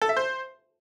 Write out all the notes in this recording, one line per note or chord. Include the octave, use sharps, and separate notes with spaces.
A4
E5
C5